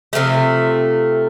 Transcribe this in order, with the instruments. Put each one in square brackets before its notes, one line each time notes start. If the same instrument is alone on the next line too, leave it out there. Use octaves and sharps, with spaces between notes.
[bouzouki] C3 F3 A3